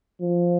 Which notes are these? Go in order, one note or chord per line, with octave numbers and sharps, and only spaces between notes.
F3